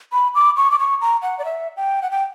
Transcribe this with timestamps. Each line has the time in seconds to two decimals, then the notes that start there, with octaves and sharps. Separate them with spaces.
0.13 B5
0.35 D6
0.57 C#6
0.71 D6
0.79 C#6
1.01 A#5
1.22 F#5
1.39 D5
1.45 E5
1.77 G5
2.02 F#5
2.11 G5